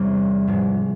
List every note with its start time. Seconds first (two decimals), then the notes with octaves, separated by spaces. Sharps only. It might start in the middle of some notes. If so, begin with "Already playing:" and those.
Already playing: E2 C3 E3 G3 C#4
0.47 G#2 F3 G#3